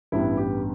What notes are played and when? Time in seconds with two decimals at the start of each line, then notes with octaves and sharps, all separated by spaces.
0.12 A1 G2 G3 B3 E4
0.37 G4